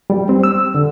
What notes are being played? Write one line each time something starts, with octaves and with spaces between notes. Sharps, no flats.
G3
C4
E6
D3